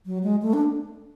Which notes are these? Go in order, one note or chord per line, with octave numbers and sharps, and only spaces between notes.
F#3
G#3
A3
D4